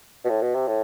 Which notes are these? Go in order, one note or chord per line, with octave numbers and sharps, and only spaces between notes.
B2
A2
B2
C3
A2